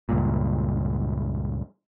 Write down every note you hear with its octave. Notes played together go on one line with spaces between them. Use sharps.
C#2 G2 A#2